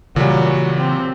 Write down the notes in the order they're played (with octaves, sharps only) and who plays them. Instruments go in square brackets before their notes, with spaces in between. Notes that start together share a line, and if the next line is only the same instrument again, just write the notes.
[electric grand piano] A#2 G3 [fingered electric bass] C#3 E3 [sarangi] F#3
[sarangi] C4